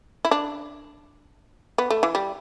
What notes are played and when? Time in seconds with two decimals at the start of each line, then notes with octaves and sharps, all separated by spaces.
0.25 E4
0.31 D4
1.78 B3
1.90 A3
2.03 E3
2.15 G3